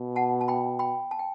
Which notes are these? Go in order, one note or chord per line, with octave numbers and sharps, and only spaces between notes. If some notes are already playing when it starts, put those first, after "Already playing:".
Already playing: B2
F#5 A5
A5
G5 B5
G5 B5
A5
G5